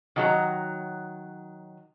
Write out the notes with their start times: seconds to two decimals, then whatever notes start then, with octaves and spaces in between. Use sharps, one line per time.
0.16 D#3 F#3 A4 A#5